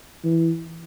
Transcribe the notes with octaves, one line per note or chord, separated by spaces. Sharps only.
E3